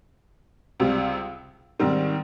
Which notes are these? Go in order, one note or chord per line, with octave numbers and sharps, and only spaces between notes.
C#2 C3 G3
G#2 D#3 G3 C4